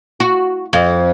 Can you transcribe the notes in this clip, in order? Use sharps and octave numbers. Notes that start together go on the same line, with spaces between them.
F#4
F2